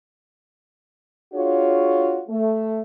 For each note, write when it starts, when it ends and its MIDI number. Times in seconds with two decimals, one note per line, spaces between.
1.34 2.20 62
1.34 2.20 65
1.34 2.20 66
1.34 2.20 68
1.34 2.20 73
2.28 2.79 57